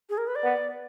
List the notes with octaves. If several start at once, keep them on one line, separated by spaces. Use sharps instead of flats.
G#4
A#4
B4
D5
B3